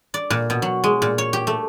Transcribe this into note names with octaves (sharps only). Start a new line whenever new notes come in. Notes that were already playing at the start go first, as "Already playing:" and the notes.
D5
A#2
B2
F#3
G#3
A#2
C#5
G4
A3